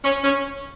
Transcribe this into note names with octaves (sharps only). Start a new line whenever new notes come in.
C#4
C#4